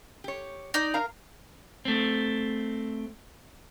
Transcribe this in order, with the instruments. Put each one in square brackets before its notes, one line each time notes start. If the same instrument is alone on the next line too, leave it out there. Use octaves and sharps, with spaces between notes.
[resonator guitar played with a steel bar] G4 C#5
[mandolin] D#4 D5
[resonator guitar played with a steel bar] A#4 F5 A#5
[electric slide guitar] A3 C4